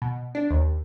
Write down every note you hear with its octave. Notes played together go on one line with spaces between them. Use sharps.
B2
D4
D#2